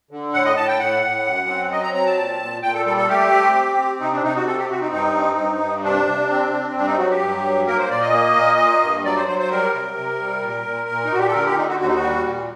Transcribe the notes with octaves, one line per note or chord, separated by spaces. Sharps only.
D3
A2 F#5
D#5
A2 A5
G5
A2 F#5
A2
F#2
C4
F#3 D#5
A#5
C4 A#5
A5
A#2
A#2
A#2 G5
A4
G3 A4
A4
A3 G4
C4
C4
C4
C3 D#4
D4
C3 D#4
F#4
C4 A4
G4
C4 F#4
D#4
G2 D#4
C4
G2
G2
C3 D4
C3
C4
C4
G2 D4
D#4
F#3 F#4
G4
G2
F#3
A#3 A#4
C5
A#2 D5
D#5
A#3
A#2
A#3
G2
F#3 D5
C5
F#3 C5
C5
G3 A#4
C3
C3
G3
A#2
A#2
A#2
D#4
A#2 F#4
G4
A4
D3 A#4
G4
D3 D#4
F#4
D#2 F#4
D#4
F#4
G3
A#2